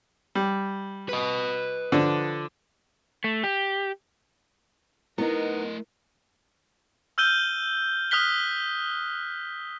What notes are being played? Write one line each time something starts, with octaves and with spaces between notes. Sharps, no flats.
G3
B4 D#5
D3 F3 D4
A3
G4
A3 B3 D#4 E4 A#4 D#5
E6 F6 G6 D#7 G7
D#6 F6 F#6 B6 G7